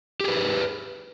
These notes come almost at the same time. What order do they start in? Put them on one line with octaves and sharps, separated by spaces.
G4 G#4 B4